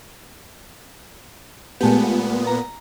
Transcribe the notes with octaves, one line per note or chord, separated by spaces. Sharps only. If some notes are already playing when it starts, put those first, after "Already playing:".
A#2 G#3 A3 B3 G4
A#5